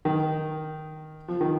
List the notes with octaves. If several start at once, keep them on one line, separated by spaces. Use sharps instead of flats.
D#3
F3
D#3